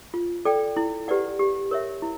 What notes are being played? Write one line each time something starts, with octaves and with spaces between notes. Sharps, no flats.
F4
A4 D5 G5
E4
G4 B4 D5 F#5
G4
A#4 C#5 E5
E4